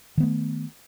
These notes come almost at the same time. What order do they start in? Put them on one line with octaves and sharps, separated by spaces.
D#3 B3 A3